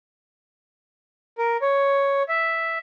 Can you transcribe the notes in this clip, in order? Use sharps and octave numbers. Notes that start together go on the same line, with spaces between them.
A#4
C#5
E5